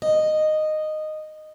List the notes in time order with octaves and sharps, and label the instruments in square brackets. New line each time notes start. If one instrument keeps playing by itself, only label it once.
[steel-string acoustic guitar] D#5